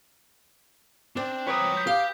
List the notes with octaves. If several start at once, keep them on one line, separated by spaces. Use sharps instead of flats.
C4 D4
B4 C#5 A#5 D6 D#6
G6 B6
G4 F5